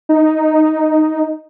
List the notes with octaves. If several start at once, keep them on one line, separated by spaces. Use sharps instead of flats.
D#4